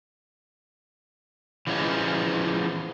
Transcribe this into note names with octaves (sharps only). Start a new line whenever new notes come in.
E3 F3 G#3 B3 C#4